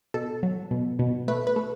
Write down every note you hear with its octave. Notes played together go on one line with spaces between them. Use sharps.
B2 A4
F#3
B2
B2
A3 B4
B4
A3